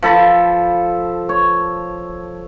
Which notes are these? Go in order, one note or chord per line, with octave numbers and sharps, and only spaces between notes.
F3 A4 B5
C#5